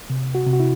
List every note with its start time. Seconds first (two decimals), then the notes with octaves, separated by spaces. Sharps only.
0.10 C3
0.35 F#4
0.47 C3
0.53 F#4
0.60 E4